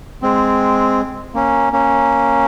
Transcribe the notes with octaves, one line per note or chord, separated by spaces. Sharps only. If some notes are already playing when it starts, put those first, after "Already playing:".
G#3 C4
A#3 C#4
A#3 C#4